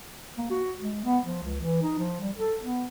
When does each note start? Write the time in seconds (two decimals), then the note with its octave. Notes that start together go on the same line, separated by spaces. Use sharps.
0.38 A#3
0.51 F#4
0.80 G#3
1.05 B3
1.24 F3
1.44 C#2
1.61 E3
1.83 D#4
1.99 F3
2.20 G3
2.38 A4
2.61 B3